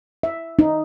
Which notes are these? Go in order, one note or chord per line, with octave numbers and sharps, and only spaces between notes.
E5
D#4